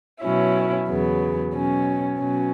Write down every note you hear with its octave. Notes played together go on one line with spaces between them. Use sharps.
B2 F#3 C#4 E4
E2 C#3 F#3 B3
B2 F#3 C#4
B2 F#3 C#4